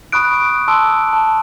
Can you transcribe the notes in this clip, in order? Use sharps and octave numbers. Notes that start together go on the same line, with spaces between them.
B5 C#6 D#6 F#6 D7
A5 C6 E6 D7
A5